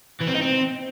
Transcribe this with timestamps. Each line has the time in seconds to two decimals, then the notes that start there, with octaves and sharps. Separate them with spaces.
0.20 E3
0.27 C4
0.34 D#4
0.41 C4